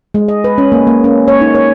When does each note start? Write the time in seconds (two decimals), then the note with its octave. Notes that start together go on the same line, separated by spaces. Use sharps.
0.14 G#3
0.28 D#5
0.44 B4
0.58 C#4
0.72 A#3
0.87 A#3
1.04 C#4
1.28 C#5
1.41 D#4
1.55 C#5